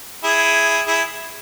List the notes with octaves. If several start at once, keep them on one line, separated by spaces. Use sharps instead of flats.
E4 G#4
E4 G#4